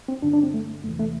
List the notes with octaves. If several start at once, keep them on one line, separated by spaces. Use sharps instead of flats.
C4
G2 D3 D4
D4
C4
A3
E2 C3 E3 A3
A3